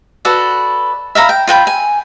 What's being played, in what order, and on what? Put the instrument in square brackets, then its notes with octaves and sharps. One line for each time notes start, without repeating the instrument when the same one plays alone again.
[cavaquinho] F#4 A4 B4 D5
E5 F5 A#5 B5
G5
F4 F#5 G5 B5
G#5